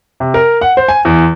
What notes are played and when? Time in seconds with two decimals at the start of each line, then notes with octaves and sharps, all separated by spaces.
0.20 C3
0.34 A#4
0.61 F#5
0.77 C5
0.88 G#5
1.05 E2